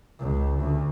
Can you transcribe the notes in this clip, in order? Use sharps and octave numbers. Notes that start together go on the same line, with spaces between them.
C#2
D2